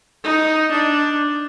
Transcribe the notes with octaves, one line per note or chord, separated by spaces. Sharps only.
D#4
D4